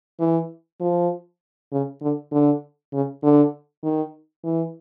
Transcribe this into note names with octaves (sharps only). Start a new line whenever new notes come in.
E3
F3
C#3
D3
D3
C#3
D3
D#3
E3